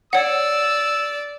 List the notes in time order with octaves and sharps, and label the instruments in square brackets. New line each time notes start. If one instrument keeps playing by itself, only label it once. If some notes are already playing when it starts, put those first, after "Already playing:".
[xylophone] C#5 F#5 [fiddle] D5 [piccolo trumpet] E6